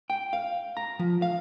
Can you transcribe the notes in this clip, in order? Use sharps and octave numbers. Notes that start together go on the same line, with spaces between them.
G5
F5
A#5
F3
F5